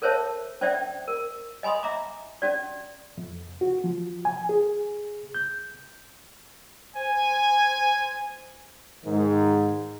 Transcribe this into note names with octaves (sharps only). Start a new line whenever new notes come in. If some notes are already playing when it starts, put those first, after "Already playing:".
A4 A#4 C5 C#5 E5 A5
C#4 C5 D5 E5 G5
A#4
D#5 G#5 B5 C6 D#6
E5 A#5 D6
C#4 F#4 D5
F2
F#4
F3
G#5
G#4
G6
C5 G#5
G#2 D#3